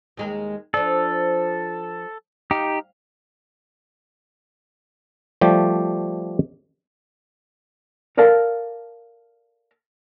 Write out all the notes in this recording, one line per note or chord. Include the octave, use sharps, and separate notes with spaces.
D#2 G#3 A#4
F3 D4 A4
D#4 G4 F5
F3 G3 A3 G4
A4 A#4 D5 F5 A5